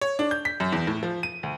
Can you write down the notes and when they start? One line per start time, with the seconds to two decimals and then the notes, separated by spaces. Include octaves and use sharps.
0.01 C#5
0.19 D4
0.31 G6
0.45 B6
0.60 F#2
0.72 E2
0.87 A2
1.03 F3
1.23 D#7
1.43 D2